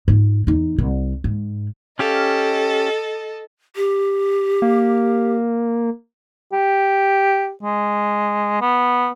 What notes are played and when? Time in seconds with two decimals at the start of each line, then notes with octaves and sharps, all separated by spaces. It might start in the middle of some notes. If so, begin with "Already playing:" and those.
0.08 G#2 F4
0.47 E2 D#4
0.78 C2
1.24 G#2
1.99 C#4 G4 A4 D#5 F5
3.76 G4
4.62 A#3
6.53 G4
7.63 G#3
8.61 B3